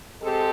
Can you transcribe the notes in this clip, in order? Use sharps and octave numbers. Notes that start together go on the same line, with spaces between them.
G#3 C4 G4 A4